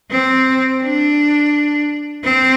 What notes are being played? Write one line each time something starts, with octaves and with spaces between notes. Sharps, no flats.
C4
D4
C4